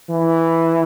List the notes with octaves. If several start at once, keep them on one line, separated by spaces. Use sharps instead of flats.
E3